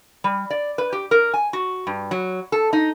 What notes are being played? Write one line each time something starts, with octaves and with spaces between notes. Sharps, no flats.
G3
D5
B4
G4
A#4
G#5
F#4
G2
F#3
A4
D#4